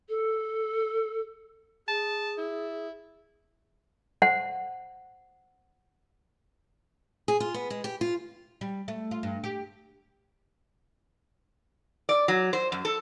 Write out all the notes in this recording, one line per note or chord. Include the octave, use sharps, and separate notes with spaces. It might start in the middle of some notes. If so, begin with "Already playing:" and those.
A4
G#4 A5
E4
C5 F#5
G#4
F4
B3
G#3
G4
F4
G3
A3
F4
G2
G4
D5
F#3
C5
F#2
A4